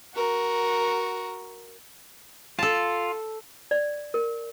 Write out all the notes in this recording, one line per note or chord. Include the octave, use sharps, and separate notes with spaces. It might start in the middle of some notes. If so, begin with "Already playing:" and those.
F#4 A#4
F4 A4 A5
D5
A#4